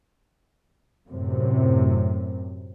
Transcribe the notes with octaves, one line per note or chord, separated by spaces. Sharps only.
F#2 A2 C3